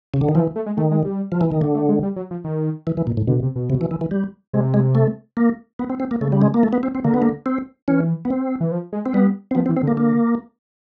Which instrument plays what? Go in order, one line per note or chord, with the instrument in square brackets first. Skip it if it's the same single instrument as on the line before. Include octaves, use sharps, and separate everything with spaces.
[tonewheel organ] C#3
D3
D#3
[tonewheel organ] E3 [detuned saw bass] F3
[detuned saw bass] A3
G#3
[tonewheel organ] D#3 [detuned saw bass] A3
[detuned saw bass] G#3
G3
[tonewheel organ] F3
E3
D#3
[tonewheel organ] D3 [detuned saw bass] A3
[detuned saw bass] A3
G#3
G3
F#3
F3
D#3
[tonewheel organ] E3
E3
A#2
A2
[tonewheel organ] B2 [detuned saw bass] D3
[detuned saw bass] C3
B2
[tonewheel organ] C3
E3
E3
E3
G3
[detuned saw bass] C3 [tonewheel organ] G#3
[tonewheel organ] G#3
A3
A#3
B3
C4
C4
A#3
[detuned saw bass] C#3 [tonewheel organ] A3
[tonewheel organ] G3
G#3
A#3
A3
B3
C4
C4
[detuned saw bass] D3 [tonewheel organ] A#3
[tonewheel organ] B3
A#3
C4
[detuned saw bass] E3 [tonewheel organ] C#4
[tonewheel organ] B3
C4
[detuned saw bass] E3
F3
G#3
[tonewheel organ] C4
[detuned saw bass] G3 [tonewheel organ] B3
[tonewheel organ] C4
[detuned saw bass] F3 [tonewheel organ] B3
[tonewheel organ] C4
[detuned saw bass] E3
[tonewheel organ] C4
[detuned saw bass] D3 [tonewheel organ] A#3
[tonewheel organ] A#3